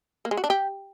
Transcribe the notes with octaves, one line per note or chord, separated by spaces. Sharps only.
A#3
G#3
F#4
D4
G4